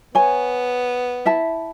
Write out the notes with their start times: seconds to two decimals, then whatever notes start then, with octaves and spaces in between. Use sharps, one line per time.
0.15 B3 C#5 G#5
1.25 E4 E5 A5